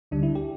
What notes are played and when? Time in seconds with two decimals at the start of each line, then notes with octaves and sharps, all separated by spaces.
0.11 D2 D3 G3 D4
0.23 E4
0.35 G4